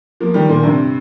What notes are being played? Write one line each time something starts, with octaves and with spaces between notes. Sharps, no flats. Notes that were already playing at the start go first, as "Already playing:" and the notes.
F3 A#3
D#3 G3
A#2 D#3
G2 C3